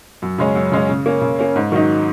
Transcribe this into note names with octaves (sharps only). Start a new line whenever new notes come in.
F#2
C#3 G#3 C#4
F#2
C#3 G#3 C#4
C#3
A#3 C#4
C#3
A#3 C#4
G#2
D#3 F#3 D#4